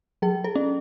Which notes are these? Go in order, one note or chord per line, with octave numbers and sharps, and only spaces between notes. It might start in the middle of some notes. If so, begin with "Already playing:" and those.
F#3 G#4
A4
C#4